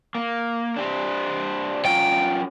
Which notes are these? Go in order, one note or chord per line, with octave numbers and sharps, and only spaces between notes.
A#3
D4 G4 C5
F#3 C#4 F4 G5